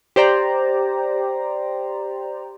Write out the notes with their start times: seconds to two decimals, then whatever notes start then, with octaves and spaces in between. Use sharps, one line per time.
0.16 G4 C5 D5 A#5